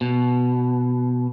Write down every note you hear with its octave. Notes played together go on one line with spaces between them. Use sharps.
B2